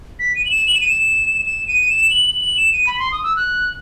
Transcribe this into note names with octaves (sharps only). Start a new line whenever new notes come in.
B6
D#7
F#7
E7
F#7
E7
D#7
E7
E7
D#7
E7
F#7
F#7
F#7
E7
D#7
B5
C6
D#6
E6
F#6